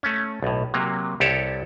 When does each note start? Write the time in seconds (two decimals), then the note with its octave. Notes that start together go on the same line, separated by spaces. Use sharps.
0.03 A3 C#4
0.42 B1 A2
0.74 C3 F#3 A#3
1.20 C2 G4 A4 C#5 A5